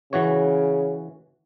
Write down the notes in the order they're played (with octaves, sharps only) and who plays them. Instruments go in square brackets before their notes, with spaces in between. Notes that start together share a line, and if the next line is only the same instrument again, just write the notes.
[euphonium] C#3 [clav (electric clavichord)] E3 F#4 C#5